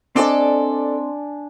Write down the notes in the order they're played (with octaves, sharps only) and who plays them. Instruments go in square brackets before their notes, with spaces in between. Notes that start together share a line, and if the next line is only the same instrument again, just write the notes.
[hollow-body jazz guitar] C4 D#5 [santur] D4 G#5 D6 [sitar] A4 D5